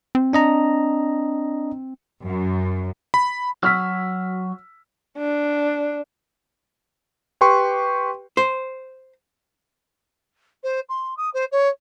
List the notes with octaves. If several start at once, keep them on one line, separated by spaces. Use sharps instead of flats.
C4
D4 D#5 A#5
F#2
B5
F#3 F#4 E6 F6 B6
D4
G4 B4 G5 C6 C#6
C5
C5
C6
D#6
C5
C#5